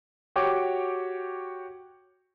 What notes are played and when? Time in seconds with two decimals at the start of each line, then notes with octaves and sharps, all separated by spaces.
0.36 F#4 G4 C#5 G5 D6